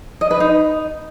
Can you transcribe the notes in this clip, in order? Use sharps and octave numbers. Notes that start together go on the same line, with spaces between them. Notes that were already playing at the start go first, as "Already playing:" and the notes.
D#5
B4
D#4